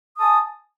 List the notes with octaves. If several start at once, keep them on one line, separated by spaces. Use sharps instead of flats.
G#5 A5 D#6